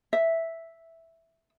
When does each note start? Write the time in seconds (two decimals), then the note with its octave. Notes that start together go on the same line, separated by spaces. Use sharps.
0.13 E5